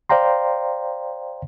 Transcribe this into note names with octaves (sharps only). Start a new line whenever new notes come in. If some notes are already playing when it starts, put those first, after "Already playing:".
C5 D5 F5 G5 A#5 C6